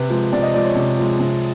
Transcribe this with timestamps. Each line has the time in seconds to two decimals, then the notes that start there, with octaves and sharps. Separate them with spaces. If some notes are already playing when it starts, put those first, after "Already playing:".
Already playing: C3 B4
0.10 F3 G#3
0.33 C3 D5
0.43 D#5
0.54 F3 G#3 D5
0.65 C#5
0.75 C3
0.98 F3 G#3
1.20 C3